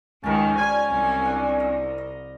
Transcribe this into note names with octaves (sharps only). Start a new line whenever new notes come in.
C#2 D#3 C#4 A#4 A5
F3 G3 G#5 C6
C2
D4
D#5 F5
D#5